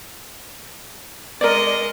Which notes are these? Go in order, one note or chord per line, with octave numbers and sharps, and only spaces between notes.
G#3 A#4 D5 D#5